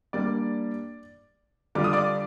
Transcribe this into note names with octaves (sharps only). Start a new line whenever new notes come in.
G3 A#3 D4 D5 D6
D3 G3 D4 F4 D6
D#6
D5 D6